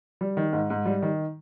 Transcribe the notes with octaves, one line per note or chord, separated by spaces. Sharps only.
G3
D#3
G#2
G#2
G3
D#3